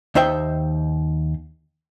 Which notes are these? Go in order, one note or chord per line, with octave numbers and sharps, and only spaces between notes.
D#2 D#4 C5 E5 G5